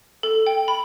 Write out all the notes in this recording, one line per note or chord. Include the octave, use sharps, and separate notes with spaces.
A4
G5
B5